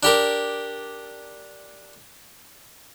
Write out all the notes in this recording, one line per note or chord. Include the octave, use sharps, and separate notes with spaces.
D4 G4 A#4